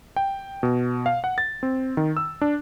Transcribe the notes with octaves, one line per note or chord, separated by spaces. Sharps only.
G5
B2
F5
F#5
A6
C4
D#3
E6
D4